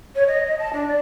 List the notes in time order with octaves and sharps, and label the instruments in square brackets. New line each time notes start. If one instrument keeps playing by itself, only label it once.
[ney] C#5
D#5
D#5
A5
D4
D5